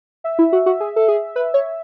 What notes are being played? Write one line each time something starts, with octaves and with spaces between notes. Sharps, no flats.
E5
E4
F#4
F#4
G#4
A4
G#4
B4
C#5